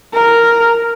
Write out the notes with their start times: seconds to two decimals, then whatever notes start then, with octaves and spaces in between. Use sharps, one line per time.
0.13 A#4